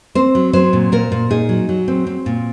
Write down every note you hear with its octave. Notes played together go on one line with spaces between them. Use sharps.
C4 C5
F#3
F#3 C5
A#2
A#2 A#4
A#2
D#4 G#4
F#3
F#3
C4
C4
A#2